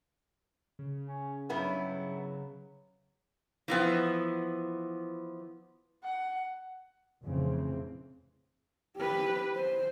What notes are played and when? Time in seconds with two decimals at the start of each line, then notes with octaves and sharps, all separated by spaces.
0.79 C#3
1.05 C#4
1.49 G2 F#3 B3 E4
3.68 E3 F3 B3
6.03 F#5
7.23 F1 C#3 E3 F3 C4
8.97 G4 B4
9.56 C5